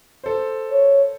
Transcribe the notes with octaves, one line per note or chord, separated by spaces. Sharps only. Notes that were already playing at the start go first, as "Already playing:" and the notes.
A4 C5
C#5